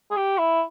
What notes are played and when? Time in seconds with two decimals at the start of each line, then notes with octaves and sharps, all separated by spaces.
0.11 G#4
0.17 G4
0.38 E4